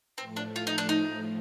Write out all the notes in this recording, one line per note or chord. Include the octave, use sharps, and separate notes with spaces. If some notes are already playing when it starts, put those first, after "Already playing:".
A2 F3 A3 C4
D4
F4
D#4
D4
D#4